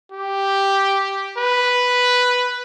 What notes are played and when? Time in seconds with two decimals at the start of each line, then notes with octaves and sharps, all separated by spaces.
0.12 G4
1.38 B4